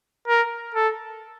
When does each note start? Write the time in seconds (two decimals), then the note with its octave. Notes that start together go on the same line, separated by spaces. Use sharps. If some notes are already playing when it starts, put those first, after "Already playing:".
0.28 A#4
0.74 A4